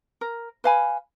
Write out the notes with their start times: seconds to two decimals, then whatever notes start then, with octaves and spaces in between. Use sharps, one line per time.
0.21 A#4
0.64 B4 F5 G#5 B5